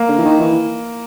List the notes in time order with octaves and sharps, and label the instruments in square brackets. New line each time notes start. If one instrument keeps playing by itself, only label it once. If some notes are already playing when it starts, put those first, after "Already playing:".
Already playing: [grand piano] A#3
[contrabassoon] D3
E3
D#3
E3